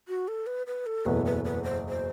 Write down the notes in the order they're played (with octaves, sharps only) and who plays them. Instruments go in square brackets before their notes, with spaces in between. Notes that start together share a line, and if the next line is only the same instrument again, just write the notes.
[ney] F#4
A4
B4
B4
A4
[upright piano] F#1 E2 B2 A3 [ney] B4
[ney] B4
B4
C5
C5